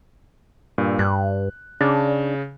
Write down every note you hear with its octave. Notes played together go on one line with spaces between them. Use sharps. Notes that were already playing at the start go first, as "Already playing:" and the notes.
G2 A#2
G2 F#6
C#3 D4